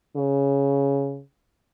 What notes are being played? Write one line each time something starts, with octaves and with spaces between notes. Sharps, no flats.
C#3